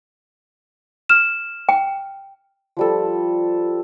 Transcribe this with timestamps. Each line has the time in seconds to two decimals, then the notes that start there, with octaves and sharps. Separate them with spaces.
1.09 F6 E7
1.69 G5
2.77 F3 G3 A4